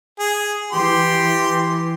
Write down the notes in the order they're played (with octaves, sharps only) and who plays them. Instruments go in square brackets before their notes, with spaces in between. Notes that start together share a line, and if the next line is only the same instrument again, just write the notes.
[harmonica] G#4
[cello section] E3 [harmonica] G4 C6